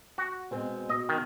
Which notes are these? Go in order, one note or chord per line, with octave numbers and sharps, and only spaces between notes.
F#4
B2 G#3 C4
B2 D#5
D#3